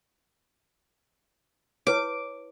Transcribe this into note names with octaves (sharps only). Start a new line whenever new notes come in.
E4 B4 C#5 D6